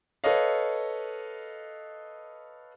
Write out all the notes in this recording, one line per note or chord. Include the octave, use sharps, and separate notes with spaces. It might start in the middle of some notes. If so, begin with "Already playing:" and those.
A4 B4 C#5 D#5 F5